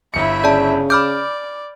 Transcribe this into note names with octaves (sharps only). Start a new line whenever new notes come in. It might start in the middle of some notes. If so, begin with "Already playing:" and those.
G1 E4 E5 C#7
C#3 D5 A5
D5 B5 D6 F6 G6